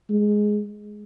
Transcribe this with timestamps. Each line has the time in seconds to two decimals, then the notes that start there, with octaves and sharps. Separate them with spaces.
0.10 G#3